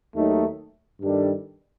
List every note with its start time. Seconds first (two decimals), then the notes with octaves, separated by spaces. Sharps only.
0.14 D#2 D#3 F#3 A3 D#4
1.00 G2 D#3 G3 D4 A4